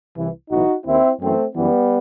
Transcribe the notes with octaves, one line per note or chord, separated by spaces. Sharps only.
C2 C3 E3
B1 A2 E3 D#4 F#4
D#2 D#3 C4 E4
F#2 E3 A3 C4
F#2 E3 G3 B3